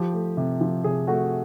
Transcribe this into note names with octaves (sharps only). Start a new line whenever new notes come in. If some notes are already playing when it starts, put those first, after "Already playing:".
Already playing: F3 G4
A3
C3
F3
C3 G#4
A3 F#4